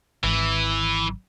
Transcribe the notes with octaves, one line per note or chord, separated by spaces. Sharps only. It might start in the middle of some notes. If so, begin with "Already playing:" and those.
G#1 E3